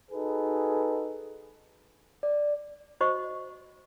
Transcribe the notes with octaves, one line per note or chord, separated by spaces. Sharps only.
D#4 F#4 G#4 A4 B4
D5
F#4 C5 D#5 C#6